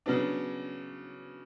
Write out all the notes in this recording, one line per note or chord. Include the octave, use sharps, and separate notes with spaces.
C#3 F#3 B3 D4